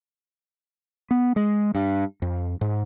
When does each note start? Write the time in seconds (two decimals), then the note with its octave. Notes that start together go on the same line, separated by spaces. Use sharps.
1.11 B3
1.36 G#3
1.75 G2
2.22 F2
2.61 G#2